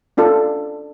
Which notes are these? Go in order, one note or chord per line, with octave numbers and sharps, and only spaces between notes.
C#4 D4 F4 A4